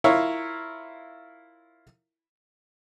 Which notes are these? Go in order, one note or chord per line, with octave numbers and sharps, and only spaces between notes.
E4 F4 A#4 C#5 F5